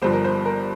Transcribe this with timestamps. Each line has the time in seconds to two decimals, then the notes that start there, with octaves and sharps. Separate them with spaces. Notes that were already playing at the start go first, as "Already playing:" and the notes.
0.02 G1 G2 F3 C5
0.13 A#4
0.25 C5
0.45 A#4